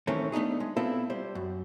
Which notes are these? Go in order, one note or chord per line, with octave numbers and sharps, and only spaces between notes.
D#3 E3 A3 C4 C#4
A3 B3 D4 D#4 G#4
G#3
B3 C4 E4 F4 A4
G3 C5
F#2